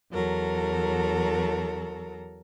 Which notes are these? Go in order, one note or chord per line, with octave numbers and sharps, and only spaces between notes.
E2 F#3 A4 A#4